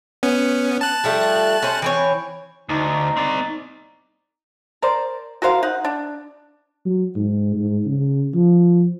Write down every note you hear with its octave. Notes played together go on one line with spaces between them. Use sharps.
B3 C#4
A5 F#6
F3 G3 A3
C#4 C5
E3 C4 C#5
D2 D#4
C4 D5
A#4 C5 D5
F#4 A#4 C5 F5
D#4 F#5
D4
F#3
G#2
G#2
C#3
F3